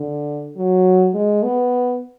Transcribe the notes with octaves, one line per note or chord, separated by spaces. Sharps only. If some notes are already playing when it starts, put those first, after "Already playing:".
Already playing: D3
F#3
G#3
B3